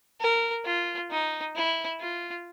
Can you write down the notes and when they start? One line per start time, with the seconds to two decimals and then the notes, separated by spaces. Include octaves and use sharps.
0.21 A#4
0.65 F4
1.11 D#4
1.56 E4
2.01 F4